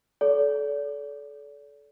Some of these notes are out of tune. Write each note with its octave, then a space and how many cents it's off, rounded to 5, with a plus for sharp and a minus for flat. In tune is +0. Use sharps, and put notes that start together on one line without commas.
A4 -25 D5 -35